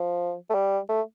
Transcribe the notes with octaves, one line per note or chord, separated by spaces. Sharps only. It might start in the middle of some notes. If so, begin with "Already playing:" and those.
Already playing: F3
A3
G3
A3